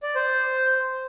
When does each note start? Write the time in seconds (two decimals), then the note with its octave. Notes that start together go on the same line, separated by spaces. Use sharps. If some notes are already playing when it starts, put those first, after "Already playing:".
0.03 D5
0.15 C5